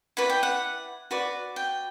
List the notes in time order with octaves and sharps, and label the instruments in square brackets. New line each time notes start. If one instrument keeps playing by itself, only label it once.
[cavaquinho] E4 B4 D5 F#5
G5
F#5
F#4 B4 D5
G5